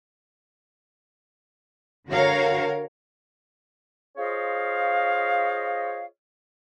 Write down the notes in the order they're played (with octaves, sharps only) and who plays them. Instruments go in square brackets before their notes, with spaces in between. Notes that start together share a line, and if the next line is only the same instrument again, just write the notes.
[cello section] D3 F#4 A#4 C#5 F5
[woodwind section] F4 G#4 C5 C#5 D#5 F5